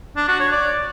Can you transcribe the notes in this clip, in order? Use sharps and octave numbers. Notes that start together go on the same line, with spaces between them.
D4
F#4
C#5
D5